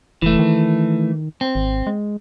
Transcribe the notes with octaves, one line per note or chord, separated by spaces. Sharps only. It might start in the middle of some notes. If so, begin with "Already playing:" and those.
F1 E3 A3
D#3
C4
G#1
G#3